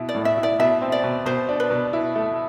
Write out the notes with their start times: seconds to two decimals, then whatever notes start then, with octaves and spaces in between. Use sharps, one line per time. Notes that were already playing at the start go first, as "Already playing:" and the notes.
Already playing: B2 E4
0.09 D5
0.14 A2
0.25 E5
0.38 E4
0.43 D5
0.59 B2 E5
0.81 C4
0.92 D5
1.03 B2
1.26 B2 C5
1.49 D4
1.60 B4
1.70 B2
1.93 E4
2.15 A3